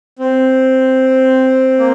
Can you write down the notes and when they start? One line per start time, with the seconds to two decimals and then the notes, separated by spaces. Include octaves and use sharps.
0.19 C4
1.79 A#3